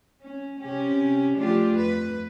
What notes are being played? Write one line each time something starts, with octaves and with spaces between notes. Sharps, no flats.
C#4
C3 C#4 G4
F3 A3 D4 F4 G4
F2 B4